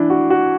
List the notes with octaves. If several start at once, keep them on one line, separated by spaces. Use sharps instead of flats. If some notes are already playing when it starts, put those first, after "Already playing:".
Already playing: E3 D4
F#4
F#4